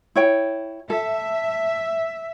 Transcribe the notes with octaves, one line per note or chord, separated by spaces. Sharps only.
E4 C#5 G5
A4 E5